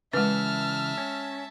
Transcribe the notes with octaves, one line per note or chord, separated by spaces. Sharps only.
C#3 E3 G#3 B4 E5 A5 F6
C#4